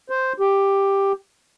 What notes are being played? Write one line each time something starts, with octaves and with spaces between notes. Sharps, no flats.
C5
G4